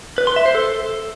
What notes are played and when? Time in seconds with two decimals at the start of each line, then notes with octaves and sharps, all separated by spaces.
0.18 B4
0.27 C6
0.36 E5
0.46 C5
0.55 A4